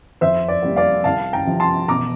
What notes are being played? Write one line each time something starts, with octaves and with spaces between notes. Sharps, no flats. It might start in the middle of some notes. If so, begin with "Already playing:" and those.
F2 C5 E5
D5
C3 G3 A#3
D5 F5
C2 F5 A5
G5 A#5
C3 F3
A5 C6
E1 A#5 D6